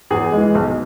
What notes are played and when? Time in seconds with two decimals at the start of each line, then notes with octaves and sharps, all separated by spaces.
0.10 E2 G#4
0.33 E3 G#3
0.55 B1